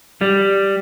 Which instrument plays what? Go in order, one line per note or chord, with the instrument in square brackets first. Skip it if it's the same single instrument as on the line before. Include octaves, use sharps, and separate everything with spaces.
[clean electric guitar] G3